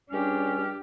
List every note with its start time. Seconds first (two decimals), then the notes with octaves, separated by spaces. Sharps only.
0.11 C#2 G3 C#4 D4 G4 F6